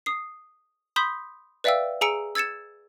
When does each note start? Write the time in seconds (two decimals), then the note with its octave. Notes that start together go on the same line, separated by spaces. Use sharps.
0.06 D#6 C7
0.96 B5 C6 D#6 G6 B6
1.64 B4 D5 E5 F5 G5 E6
2.01 G#4 G#5 A#5 E6 C#7 D7
2.35 E6 G#6 A6 C#7 E7